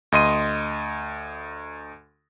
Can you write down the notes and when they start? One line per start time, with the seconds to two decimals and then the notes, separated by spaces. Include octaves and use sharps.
0.12 D2 D#5 C6 D#7